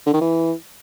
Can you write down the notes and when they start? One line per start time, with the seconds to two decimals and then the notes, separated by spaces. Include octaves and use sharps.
0.06 D3
0.13 D#3
0.21 E3